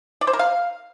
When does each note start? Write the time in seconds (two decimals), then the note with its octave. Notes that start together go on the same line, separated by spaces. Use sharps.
0.21 D5
0.27 C5
0.33 A#4
0.39 F5